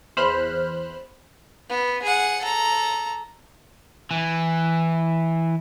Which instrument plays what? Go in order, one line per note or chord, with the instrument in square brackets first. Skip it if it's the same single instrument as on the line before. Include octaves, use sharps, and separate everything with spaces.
[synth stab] E2 C5 B5 F6 F#6
[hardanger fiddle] B3
G#4 F#5
A4 A#5
[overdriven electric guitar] E3